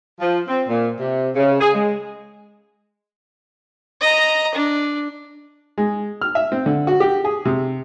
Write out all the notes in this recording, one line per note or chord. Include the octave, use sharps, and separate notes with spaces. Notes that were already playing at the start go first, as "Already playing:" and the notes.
F3
C4
A#2
C3
C#3
G#4
G#3
D#5 A#5
D4
G#3
F6
E5
C4
D3
F#4
G4
G#4
C3